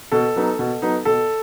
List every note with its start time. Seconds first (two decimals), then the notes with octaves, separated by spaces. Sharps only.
0.12 B2 A4
0.36 F#3 B3 D#4
0.59 B2
0.82 F#3 B3 D#4
1.05 B2 A4